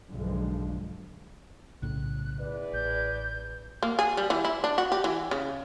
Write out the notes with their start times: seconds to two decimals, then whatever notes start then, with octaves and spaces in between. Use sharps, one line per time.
0.11 B1 G2 D3 F3 G#3
1.82 B1 A2 C#3 F#6
2.39 E2 B4 D5
2.73 A1 G6
3.83 A#3
3.99 G#4
4.17 G3
4.30 E3
4.45 E4
4.64 D4
4.78 F#4
4.92 G4
5.04 E3
5.31 C#3